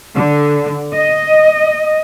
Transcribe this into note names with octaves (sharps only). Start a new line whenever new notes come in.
D3
D#5